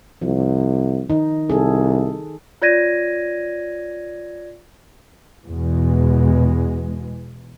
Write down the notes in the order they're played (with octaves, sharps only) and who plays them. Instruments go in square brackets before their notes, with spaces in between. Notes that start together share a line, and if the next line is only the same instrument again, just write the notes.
[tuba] C2 [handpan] F3
[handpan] D#3 D#4
[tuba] C2 [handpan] G#4 A4
[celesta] F4 C#5 D5 G#6 A#6 D#7
[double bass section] E2 B2 G#3